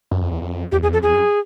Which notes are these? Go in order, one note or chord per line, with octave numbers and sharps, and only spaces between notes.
F#2
F2
E2
F2
E2 G4
E2 G#4
F2 A4
E2 G#4
F#2